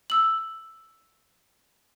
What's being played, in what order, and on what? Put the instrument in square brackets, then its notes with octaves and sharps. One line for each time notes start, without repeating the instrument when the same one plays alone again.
[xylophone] E6 F#7